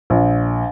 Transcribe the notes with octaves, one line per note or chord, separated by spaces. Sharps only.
A#1